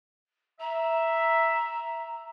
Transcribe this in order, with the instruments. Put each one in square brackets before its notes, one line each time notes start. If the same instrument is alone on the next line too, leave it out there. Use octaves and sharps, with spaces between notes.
[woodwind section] E5 [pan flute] A#5